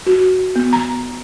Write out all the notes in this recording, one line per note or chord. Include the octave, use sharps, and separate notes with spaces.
F#4
B3
A#5